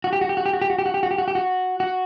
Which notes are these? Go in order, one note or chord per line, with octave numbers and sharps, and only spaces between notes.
F#4
G4
F#4
G4
F#4
G4
F#4
G4
F#4
G4
F#4
G4
F#4
G4
F#4
G4
F#4
F#4